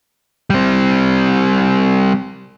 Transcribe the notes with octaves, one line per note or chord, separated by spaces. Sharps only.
G3 C4